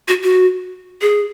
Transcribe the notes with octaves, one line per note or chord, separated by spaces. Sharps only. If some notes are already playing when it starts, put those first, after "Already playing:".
F#4
F#4
G#4